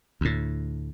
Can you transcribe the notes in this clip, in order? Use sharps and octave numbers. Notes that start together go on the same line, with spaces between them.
D2 A2